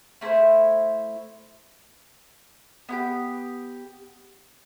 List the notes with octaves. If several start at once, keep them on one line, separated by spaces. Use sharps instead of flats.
A3 E4 A4 C5
B3 E4 G4